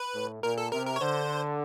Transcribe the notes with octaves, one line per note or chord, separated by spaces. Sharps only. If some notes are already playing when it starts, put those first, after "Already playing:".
Already playing: B4
A2
A#2 A#4
A4
C3 A#4
A#4
C#5
D3 C5